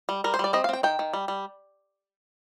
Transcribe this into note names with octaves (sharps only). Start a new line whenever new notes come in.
G3
G3 A#4
C5
G3 D5
C4 D#5
F5
C4 G5
D#3 G5
D#3
G3
G3